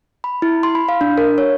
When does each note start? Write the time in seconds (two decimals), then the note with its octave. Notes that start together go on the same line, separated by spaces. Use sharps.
0.24 B5
0.42 E4
0.63 C6
0.75 B5
0.89 F5
1.01 D4
1.18 A#4
1.38 C#5